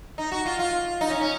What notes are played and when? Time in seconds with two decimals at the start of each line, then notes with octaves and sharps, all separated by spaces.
0.18 D#4
0.32 F#4
0.46 F4
0.59 F4
1.01 D#4
1.10 C#4
1.21 C#4